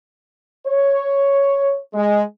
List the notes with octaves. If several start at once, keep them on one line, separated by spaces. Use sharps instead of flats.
C#5
G#3